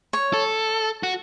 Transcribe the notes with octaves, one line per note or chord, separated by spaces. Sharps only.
C#5
A4
F#4